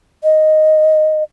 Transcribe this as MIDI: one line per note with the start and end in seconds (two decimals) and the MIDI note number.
0.24 1.23 75